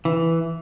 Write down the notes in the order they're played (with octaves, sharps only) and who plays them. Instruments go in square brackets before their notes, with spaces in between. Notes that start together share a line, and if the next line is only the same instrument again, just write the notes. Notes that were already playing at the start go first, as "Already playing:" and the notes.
[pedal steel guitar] E3